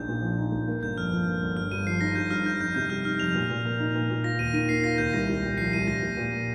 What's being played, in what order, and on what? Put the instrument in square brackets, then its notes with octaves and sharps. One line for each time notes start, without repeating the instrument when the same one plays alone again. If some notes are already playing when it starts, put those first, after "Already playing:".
Already playing: [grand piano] A#1 D#4 [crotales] G6
[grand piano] A#2
F3
D#4
A#1
A#3
[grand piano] G1 [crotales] G6
[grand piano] F2 [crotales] F6
[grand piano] F3
A#3
G1
[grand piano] G2 [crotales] F6
[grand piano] G2 [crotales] D#7
[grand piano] F3 [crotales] C7
[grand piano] D#4 [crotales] A#6
[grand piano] G2 [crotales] G6
[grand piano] G2 [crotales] F6
[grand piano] D#4 [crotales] G6
[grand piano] F2 [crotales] G6
[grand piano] C3 [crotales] G6
[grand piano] G3 [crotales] F6
[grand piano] D#4 [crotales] F6
[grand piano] F2 [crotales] F7
[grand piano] A#2
A#2
A#3
D#4
A#2
A#2
[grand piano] F4 [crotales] A#6
[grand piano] D#2 [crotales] D#7
[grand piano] D#3 [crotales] D#7
[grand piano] A#3 [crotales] C7
[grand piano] F4 [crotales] A#6
[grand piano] D#2 [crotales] G6
[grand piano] C2 [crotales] A#6
[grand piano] C2
A#2
[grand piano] F3 [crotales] C7
[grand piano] C2 [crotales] D#7
[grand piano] C2 [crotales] A#6
[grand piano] A#2
A#2
A#3